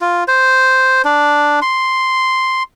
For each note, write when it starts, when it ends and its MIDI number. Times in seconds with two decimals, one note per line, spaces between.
0.01 0.24 65
0.28 1.02 72
1.05 1.60 62
1.62 2.63 84